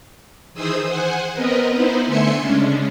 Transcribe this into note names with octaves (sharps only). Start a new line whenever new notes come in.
D#3 E3 G#4 C5 D#6 E6
C5 F#5 G#5
B3 C4 A#4 B4 D#5
B3 D#4 E4 B4 C5
D3 A3 E5 G#5 C6 C#7
C#3 G#3 C#4 D4